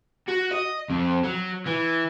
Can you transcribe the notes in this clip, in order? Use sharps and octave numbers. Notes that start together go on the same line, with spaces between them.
F#4
D#5
F2
F#3
E3